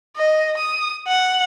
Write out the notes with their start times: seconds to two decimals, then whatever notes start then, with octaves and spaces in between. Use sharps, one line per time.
0.16 D#5
0.57 D#6
1.07 F#5